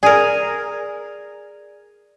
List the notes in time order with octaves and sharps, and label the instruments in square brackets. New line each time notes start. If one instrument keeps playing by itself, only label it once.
[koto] G#4 A#4 [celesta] D5 G#6 D#7